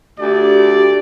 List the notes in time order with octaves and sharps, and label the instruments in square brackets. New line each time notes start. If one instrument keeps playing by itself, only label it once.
[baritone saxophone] D2 [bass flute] G4 [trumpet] D5